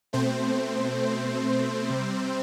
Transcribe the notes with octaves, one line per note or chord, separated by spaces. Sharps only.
B2 A3 C4 C5
C3 G3